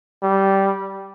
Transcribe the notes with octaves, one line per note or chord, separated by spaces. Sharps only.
G3